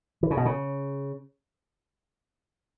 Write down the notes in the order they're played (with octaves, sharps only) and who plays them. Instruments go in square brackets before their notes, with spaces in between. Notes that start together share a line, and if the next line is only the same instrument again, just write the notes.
[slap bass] E3
C#3
B2
C#3